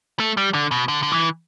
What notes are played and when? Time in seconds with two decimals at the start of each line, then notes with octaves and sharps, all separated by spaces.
0.20 A3
0.37 G3
0.54 D3
0.71 B2
0.88 D3
1.03 D3
1.12 E3